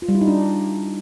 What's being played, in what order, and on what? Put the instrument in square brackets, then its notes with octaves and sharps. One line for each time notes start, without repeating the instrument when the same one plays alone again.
[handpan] F4
G3
E4
D#4
D4